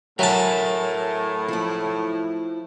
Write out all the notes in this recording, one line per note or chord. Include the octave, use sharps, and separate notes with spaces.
A2 F#3 A#4 E5 G#5 A5
F3 E4